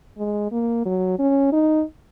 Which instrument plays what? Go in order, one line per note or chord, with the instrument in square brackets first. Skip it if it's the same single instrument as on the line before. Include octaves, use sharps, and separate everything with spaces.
[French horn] G#3
A#3
F#3
C#4
D#4